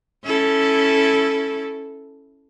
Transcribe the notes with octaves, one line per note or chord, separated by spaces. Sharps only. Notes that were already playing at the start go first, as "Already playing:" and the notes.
C#4 E4 A4